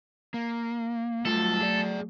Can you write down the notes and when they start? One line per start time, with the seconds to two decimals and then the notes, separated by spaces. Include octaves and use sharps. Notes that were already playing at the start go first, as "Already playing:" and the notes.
0.34 A#3
1.25 F#3 G3 A3 F4 A4
1.61 G#4 D5